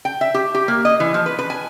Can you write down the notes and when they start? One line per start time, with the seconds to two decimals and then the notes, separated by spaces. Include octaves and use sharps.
0.05 G5
0.21 E5
0.34 G4
0.55 G4
0.68 A#3
0.85 D#5
1.00 E3
1.14 F3
1.26 B4
1.39 B4
1.50 G#5